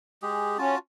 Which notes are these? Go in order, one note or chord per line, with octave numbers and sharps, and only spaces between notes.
G#3 G4 G#4
C#4 F4 F#4 A5